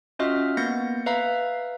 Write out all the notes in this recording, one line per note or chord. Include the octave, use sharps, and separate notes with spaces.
C#4 F4 F#4 D#5 E5 F6
A#3 B3 G6 A#6 C#7
B4 E5 F5 A#5